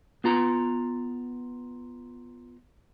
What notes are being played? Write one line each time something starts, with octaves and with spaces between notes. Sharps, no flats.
B3 F4 A#5